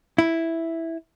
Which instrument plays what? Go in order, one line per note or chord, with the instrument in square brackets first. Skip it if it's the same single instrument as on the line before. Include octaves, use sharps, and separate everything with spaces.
[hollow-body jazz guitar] E4